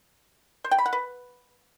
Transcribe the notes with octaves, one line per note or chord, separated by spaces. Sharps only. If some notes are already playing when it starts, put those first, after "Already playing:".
C5
G5
B5
F#5
B4